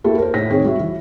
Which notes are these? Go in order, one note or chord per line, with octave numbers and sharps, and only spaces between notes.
A#3 E4 F#4 G4 A4
A#4 C5
A2 A#6 B6
D#3 C4 G#4 C#5
G3 F#4 E5
E3